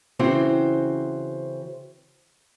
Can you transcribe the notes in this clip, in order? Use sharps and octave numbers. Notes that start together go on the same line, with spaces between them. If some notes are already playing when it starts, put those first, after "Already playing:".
C#3 E3 C4 F#4 C5 G5